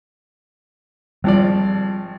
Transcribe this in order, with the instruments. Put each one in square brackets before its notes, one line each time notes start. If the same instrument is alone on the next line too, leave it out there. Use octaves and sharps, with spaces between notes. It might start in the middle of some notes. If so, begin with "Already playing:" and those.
[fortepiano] G#1 F3 D5 [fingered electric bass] G3